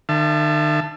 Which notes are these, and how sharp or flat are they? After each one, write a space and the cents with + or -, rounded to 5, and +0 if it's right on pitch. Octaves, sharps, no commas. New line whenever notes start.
D#3 -45 E5 +40 A5 +0